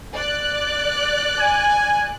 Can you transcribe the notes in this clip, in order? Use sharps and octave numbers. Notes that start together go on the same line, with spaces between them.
D5 F#6
G#5